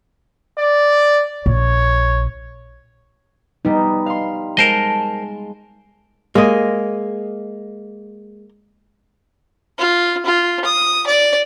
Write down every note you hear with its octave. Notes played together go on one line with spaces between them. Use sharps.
D5
A#1 C#5
G3 B3 D#4
F5 C6
G#3 A#4 C5 D#5 A5
G#3 A#3 D#5
F4
F4
D#6
D5